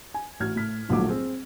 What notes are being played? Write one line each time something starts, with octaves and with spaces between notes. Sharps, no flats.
G#5
A1 F#4 F6 G#6
A2 B6
D#1 A#1 G#2 F#3 A3 D6
C4 G#4